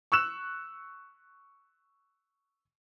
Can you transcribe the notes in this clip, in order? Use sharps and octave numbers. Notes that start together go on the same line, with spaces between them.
C#6 E6 F#6 E7